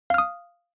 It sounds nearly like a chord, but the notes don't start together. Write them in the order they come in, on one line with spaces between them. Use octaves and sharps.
F5 F6 D#6